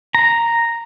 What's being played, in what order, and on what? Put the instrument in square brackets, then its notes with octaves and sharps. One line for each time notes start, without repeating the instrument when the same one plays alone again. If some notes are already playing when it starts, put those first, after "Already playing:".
[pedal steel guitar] A#5